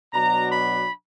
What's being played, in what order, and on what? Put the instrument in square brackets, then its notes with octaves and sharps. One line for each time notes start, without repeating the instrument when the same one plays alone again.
[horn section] B2 F#3 D4 A#5
B5